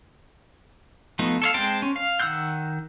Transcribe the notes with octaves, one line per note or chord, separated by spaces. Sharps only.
F3 A3 B3 D#4
A4 C#5 F5
G#3 C4 C5 G5 A5
C#4
F5
D#3 F#5 E6 F#6 G6